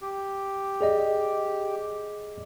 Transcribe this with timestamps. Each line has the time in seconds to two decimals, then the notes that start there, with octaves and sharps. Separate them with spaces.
0.02 G4
0.81 G#4 D5 D#5